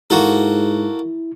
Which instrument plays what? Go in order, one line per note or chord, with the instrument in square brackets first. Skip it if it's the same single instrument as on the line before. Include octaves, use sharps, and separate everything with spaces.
[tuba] G#2 [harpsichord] A#3 F#4 A4 [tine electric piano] E4